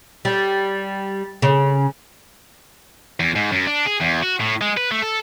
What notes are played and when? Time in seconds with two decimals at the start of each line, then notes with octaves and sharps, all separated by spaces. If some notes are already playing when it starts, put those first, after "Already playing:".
0.25 G3
1.42 C#3
3.20 E2
3.35 G#2
3.52 F#2
3.67 D4
3.86 G#4
4.02 E2
4.23 F#4
4.40 A2
4.61 G#3
4.77 B4
4.91 A3
5.02 A4